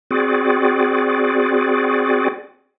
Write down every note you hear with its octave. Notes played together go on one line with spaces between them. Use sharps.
C4 F#4 G#4 D5